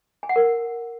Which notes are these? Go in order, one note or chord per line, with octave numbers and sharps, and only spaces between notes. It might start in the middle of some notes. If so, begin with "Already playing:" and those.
G#5
F#5
A#4